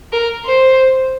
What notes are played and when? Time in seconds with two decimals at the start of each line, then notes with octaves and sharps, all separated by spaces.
0.12 A#4
0.46 C5